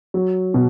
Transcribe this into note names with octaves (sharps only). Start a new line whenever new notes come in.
F#3
B2